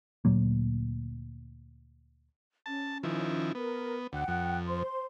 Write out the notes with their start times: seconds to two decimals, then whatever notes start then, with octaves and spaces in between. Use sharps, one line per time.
0.25 D2 A#2 F#3 A#3
2.66 C#4 A5
3.03 D#3 F3 E4
3.55 B3 A#4
4.13 D2 F#5 G5 F#6
4.28 F2
4.67 C5 C6